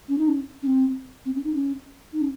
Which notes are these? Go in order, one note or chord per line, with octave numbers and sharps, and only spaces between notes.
C#4
D#4
C#4
C#4
C4
C4
C#4
D#4
C#4
D#4
C#4